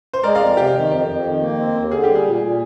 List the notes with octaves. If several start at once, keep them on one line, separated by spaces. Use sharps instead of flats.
C5
G#3 A#4 D5
F2 D5 F5
C3 G4
D#3
F2
F2
D#3
A#3
C4
D#2
D3 G#4
G4
G3
G#4
A#2
A#2